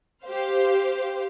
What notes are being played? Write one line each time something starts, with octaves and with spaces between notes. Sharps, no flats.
G4 C5 F5